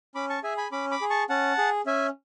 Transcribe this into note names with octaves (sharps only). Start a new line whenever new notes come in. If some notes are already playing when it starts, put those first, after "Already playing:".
C#4 B5 D6
A5 C#6
G#4 E5 G#5
G#5 B5
C#4 B5 D6
B5 D6
G#4
A5 C#6
C#4 F#5 A5
G#4
C#4 E5 G#5